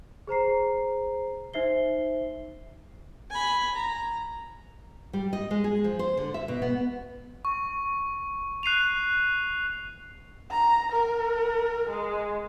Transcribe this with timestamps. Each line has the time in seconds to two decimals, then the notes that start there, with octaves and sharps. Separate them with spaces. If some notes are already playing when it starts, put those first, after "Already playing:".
0.27 G#4 C5 A#5 C7
1.54 D#4 C5 E5 C7 G7
3.31 G#5 B5
3.76 A#5
5.13 G3
5.33 D#5
5.51 G#3
5.64 G#4
5.84 F3
5.99 C5
6.17 D3
6.34 E5
6.48 B2
6.62 B3
7.45 C#6
8.63 F#6 C7 D#7 F7
10.51 A#5
10.92 A#4
11.90 G#3